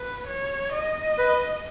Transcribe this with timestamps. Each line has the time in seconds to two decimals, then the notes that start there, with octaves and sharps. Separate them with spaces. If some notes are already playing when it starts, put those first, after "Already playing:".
Already playing: B4
0.27 C#5
0.73 D#5
1.18 B4